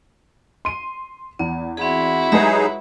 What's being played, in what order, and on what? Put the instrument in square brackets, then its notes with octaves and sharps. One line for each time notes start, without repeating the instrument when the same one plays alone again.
[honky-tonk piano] C6 D#7
[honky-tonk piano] E2 [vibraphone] B3
[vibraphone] C4 G#4 [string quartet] E4 F#4
[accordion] F#3 D#4 G#4 [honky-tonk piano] G#3 B4 [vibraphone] G4 C#5 E5